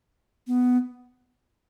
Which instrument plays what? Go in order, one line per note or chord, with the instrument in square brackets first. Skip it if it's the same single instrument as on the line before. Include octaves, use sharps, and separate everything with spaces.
[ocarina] B3